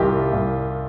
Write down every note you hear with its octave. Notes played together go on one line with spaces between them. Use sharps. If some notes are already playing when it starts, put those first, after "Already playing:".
Already playing: C2 D#3 F4 G4
C2